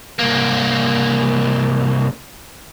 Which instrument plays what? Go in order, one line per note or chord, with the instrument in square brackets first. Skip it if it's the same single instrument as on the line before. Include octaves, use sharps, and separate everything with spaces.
[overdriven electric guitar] C2 A#3